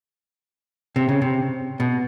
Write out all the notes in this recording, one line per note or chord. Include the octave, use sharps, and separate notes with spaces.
C3
C#3
C3
B2